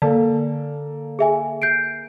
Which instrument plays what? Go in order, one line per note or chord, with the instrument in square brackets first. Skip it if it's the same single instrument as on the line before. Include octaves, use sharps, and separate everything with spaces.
[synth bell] D3 [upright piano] A#3 A4
[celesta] G#4 E5 G#5
G6 C7 D7